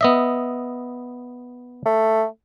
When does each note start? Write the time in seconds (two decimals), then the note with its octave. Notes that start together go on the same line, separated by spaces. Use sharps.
0.01 B3 D#5 E5
1.85 A3